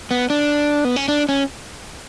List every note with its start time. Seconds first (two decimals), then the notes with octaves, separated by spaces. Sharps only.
0.11 B3
0.30 D4
0.85 B3
0.96 C#4
1.08 D4
1.29 C#4